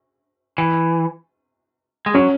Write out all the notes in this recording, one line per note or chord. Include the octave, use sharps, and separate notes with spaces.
E3
G#3
F#3 C#4